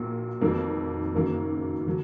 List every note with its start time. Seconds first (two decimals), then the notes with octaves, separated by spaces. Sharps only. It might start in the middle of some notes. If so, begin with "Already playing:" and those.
Already playing: A#1 A#2 F#3 A#3
0.40 F1 F2 D#3 F#3 A#3
1.14 F#1 F#2 D#3 F#3 A#3
1.87 D3 F#3